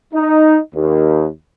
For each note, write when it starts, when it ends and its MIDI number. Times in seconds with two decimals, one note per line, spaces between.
0.14 0.58 63
0.75 1.27 39